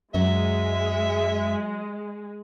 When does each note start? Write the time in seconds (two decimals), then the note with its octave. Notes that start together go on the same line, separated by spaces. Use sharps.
0.14 F#2 F#3 G#3 E5